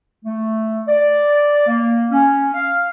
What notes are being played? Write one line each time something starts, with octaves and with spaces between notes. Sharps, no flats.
A3
D5
A#3
C#4
F5